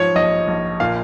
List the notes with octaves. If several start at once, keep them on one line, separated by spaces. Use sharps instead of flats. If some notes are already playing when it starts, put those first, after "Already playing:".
Already playing: G#2 F3 C#5
A#1 D#5
A#1
A#2 F5